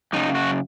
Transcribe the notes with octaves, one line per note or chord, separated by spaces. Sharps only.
F#2 C#3 D#4
F#4